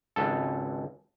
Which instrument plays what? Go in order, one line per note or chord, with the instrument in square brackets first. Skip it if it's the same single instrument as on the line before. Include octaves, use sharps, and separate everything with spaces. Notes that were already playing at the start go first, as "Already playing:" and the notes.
[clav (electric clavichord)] G#1 C#2 A4